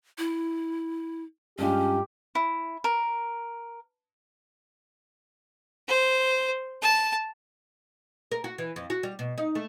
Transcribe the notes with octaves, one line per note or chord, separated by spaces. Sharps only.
E4
G2 G#3 C#4 F4 G4
E4
A#4
C5
A5
A#4
F#4
E3
F2
F#4
G3
B2
D#4
A3